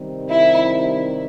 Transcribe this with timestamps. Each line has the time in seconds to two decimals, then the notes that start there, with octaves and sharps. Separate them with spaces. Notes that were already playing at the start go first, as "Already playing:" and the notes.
Already playing: C3 D#3 G3 C4
0.30 E4